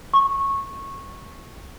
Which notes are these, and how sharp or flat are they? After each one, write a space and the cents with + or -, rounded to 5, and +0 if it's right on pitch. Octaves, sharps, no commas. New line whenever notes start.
C#6 -15